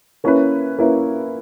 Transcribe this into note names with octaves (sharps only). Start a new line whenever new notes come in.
A#3 C#4 E4 B4
A#3 C#4 E4 B4